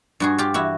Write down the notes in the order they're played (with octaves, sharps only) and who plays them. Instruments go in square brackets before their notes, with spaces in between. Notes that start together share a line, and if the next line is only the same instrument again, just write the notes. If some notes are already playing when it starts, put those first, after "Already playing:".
[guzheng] G2 F#4 G#4
F4 G4
E3 E4 F#4